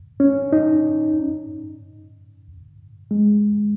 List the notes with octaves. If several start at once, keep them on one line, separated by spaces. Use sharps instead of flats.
C#4
D#4
G#3